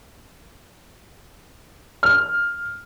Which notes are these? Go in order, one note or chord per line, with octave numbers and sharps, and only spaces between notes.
F6